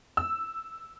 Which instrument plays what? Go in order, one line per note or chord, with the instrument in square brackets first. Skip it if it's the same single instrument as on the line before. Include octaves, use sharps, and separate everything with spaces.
[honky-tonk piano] E6